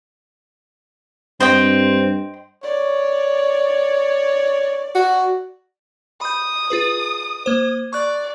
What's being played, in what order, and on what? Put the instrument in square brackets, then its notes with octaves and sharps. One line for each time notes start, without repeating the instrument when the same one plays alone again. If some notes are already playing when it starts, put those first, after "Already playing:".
[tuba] G2 [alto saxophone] C4 [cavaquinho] C5 D#5 G5
[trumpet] C#5 [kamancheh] D5
[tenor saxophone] F#4
[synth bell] B5 G6 [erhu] D#6
[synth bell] F4 G#4 B4
A#3 C5
[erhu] D5 [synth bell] C#6 F#6